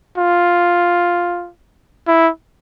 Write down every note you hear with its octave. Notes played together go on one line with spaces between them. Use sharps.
F4
E4